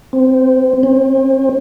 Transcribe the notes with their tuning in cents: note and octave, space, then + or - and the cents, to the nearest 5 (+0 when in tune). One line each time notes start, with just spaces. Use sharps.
C4 -10
C4 +35